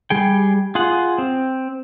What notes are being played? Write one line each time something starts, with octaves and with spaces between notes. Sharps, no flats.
G3 G#4 G5
F4 G#4 F#5
C4